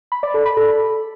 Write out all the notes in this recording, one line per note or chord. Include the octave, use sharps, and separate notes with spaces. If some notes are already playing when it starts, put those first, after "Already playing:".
B5
D5
A4
B5
A4